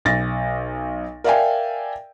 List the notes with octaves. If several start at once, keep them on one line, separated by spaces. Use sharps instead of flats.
B1 A6 A#6
A#4 D5 E5 F5 G5 G#5